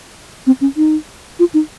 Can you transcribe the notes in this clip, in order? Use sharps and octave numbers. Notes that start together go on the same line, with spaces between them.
C4
C#4
D#4
F4
D#4